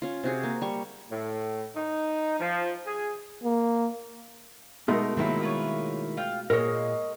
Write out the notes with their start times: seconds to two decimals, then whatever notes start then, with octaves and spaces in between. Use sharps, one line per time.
0.02 C#4 F4
0.24 C3 F#4 G#4
0.43 A#3
0.62 G3 C#6
1.10 A2
1.75 D#4
2.40 F3
2.86 G#4
3.44 A#3
4.88 B2 G#3 A3 D#4 A#4
5.17 C3 D#3 F#3 A#3 B3 E4
5.41 F4 B4 C#5
6.17 F4 F5 G5
6.50 A#2 G#3 A#4 C#5 D#5